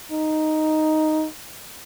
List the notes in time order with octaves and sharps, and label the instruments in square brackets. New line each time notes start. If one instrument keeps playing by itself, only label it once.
[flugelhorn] D#4